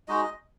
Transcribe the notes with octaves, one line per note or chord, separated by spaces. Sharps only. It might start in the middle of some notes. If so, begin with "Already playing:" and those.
G#3 D#4 F#4 D#5